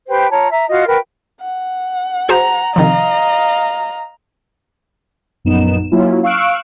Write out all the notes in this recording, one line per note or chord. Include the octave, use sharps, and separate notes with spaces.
G4 B4 C5 G5
F4 C#5 A5 A#5
E5 A#5
F4 F#4 D#5 F5
F#4 A#4 B4 G5
F#5
F#4 G#4 C5 A#5
C3 D#3 F3 D#5 F5 A#5
A#1 F#2 B3 D#4 E7
F#3 A#3 C#4 E4 F4
F5 C#6 E6 F#6 D7